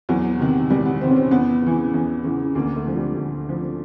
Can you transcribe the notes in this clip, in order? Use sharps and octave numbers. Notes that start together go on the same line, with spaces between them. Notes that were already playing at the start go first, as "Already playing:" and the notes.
E2 F#3
C3 D#3
E2 G3
B3
C3 D#3 C4
C#4
C4
E2 B3
C#3 E3
E2
C#3 E3
D2 A#3
A3
D3 F3
G3
D2
D3 F3